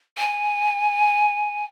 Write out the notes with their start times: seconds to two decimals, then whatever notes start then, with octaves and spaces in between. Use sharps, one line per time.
0.18 G#5